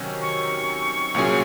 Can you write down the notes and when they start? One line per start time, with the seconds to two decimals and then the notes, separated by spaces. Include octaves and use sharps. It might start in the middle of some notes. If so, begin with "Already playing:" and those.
Already playing: C3 D#3 F#3 C#4
0.21 C#6
1.14 C2 A#2 F#3 C#4 G#4